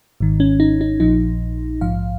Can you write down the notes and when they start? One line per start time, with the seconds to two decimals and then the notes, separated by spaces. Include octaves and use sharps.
0.20 G#1 G#2 D#3
0.40 C#4
0.60 D#4
0.81 D#4
1.00 A#1 A#2 F3 D#4
1.81 A#1 G#2 F3 F5